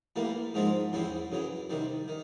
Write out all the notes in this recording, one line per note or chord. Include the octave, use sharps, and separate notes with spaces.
A2 E3 G3 A#3
G#2 F3 G#3 C4
E2 C#3 E3 G3 C4
F#2 C#3 E3
C3 D#3 G3
D#3